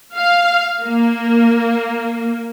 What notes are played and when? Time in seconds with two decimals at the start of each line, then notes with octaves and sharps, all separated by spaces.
0.17 F5
0.83 A#3